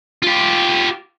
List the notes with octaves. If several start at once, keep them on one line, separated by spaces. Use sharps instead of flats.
F4 G4